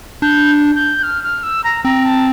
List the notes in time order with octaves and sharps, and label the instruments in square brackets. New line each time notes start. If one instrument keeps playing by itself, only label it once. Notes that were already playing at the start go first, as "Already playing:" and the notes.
[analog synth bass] D4 [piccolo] G6
[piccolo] G6
F6
F6
E6
A#5
[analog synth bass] C4 [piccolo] A#5
[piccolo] A5